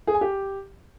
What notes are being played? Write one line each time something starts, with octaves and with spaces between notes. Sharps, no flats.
G#4
G#5
G4